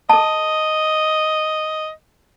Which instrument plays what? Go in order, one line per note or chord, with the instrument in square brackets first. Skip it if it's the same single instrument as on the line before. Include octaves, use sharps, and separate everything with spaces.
[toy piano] A4 A5 [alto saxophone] D#5